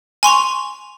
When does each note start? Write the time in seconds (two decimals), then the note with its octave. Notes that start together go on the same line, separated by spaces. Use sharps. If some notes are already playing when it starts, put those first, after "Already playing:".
0.23 G#5 C6 C#6 F7